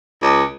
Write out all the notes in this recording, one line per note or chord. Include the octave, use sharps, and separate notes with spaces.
C#2